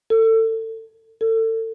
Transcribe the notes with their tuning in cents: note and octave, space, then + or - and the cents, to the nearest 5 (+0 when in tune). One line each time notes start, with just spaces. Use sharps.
A4 +30
A4 +35